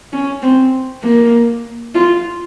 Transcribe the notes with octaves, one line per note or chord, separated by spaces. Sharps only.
C#4
C4
A#3
F4